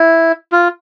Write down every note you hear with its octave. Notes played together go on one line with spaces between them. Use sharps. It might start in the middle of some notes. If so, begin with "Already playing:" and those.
Already playing: E4
F4